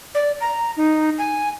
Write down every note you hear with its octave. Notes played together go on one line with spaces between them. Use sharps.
D5
A#5
D#4
G#5